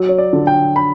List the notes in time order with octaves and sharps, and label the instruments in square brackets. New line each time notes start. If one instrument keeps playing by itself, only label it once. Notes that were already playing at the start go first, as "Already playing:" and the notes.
Already playing: [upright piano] F#3
[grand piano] C#5
D5
[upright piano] D3
[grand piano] G5
B5